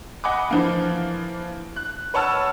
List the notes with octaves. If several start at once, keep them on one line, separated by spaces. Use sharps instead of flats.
D#5 F#5 G#5 B5 D6
E3 F3 A#3
F#6
B4 C#5 F#5 A5 E6 F6